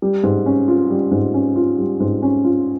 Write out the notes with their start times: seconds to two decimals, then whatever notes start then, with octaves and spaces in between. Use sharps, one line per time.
0.02 G3
0.23 G#2
0.46 C#4
0.68 F4
0.90 G3
1.12 G#2
1.34 C#4
1.56 F4
1.78 G3
2.00 G#2
2.22 C#4
2.45 F4